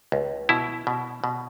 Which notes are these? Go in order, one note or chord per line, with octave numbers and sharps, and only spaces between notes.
C#2
B2 E4
B2
B2